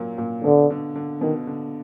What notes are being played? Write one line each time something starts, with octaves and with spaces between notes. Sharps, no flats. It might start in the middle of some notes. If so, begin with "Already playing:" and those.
Already playing: A#2 F#3 A#3
A#2
B2 D3
D3
D3
B2 D#3
D3